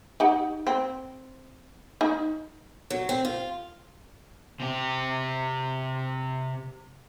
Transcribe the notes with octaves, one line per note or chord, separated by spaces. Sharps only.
D#4 G4 F#5
C4
D#4
F#3
C4
F4
C3 G4